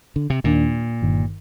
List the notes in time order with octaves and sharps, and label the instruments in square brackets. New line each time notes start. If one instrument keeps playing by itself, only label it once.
[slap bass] D3
C3
[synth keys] D#2 D#3 A#3 D4 [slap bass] A#2
[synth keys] G1 G2 D#3